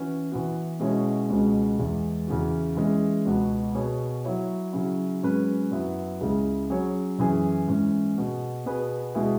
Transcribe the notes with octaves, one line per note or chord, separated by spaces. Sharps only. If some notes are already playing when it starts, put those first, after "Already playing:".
Already playing: E3 C#4 F#4 B4
E3 B3 F#4
B2 G#3 C#4 E4 C#5
C#2 B2 G#3 C#4
E2 E3 G#3
E2 C#3 E3 C#4 F#4
E3 G#3 C#4
C#2 B2 B3 F#4
B2 B3 G#4 C#5
F#3 E4 C#5
C#3 F#3 C#4 E4
G#2 F#3 C#4 G#4 B4
F#2 F#3 B3 E4
C#2 C#3 G#3 E4
F#3 C#4 G#4 C#5
F#2 E3 C#4 G#4
G#2 E3 C#4
B2 B3 G#4
B2 B3 G#4 B4
B2 G#3 E4 G#4